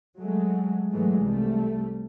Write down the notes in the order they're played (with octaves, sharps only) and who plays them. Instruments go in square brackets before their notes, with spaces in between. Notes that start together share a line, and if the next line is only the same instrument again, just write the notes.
[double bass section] F#3 G#3 A3
G#2 E3 F#3 G#3 A3
C2 G3 A3